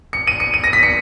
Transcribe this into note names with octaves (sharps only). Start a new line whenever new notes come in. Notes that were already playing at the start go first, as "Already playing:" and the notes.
C#7
D#7
C#7
D#7
A#6
B6
C#7